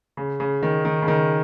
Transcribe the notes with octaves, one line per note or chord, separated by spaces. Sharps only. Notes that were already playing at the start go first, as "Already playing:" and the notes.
C#3
C#3
D#3
D#3
C#3
D#3